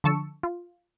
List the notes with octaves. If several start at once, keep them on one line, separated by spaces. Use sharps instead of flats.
D3 F3 A5 C#6 E6 C#7
F4